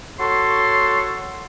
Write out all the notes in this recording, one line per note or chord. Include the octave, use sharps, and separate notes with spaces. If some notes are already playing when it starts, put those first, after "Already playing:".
F#4 A4 C#5 C6